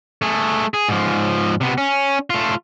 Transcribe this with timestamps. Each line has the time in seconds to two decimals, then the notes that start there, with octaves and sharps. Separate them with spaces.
0.22 A3 G#4
0.74 G#4
0.88 G#2 F3
1.61 C3 B3
1.78 C#4
2.30 A3 F4